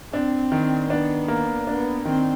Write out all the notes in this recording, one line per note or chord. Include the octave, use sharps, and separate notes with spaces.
C4 D4
D#3
B3 D4
A#3
B3 D4
D#3 C4